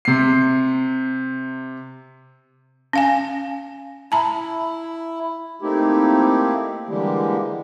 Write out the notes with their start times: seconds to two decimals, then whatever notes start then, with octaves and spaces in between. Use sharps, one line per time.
0.05 C3 C7
2.93 C#4 F5 G#5
4.12 E4 A5 A#5
5.62 A3 A#3 C4 D#4 E4 G4
6.89 D3 E3 G3 G#3 A#3 G4